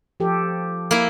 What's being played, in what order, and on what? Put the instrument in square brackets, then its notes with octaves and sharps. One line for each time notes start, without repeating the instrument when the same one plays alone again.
[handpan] F3 G4 A4
[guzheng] A#3 E4